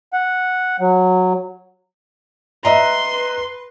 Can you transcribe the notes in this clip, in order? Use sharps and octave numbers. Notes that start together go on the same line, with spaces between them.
F#5
F#3
B4 D#5 E5 A#5 C6